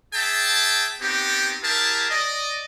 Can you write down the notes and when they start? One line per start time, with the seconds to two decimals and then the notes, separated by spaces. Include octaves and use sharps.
0.13 G#4 E5 G5 A5
1.00 B3 C4 D#4 G4
1.63 E4 G4 G#4 A#4 A5
2.09 D5 D#5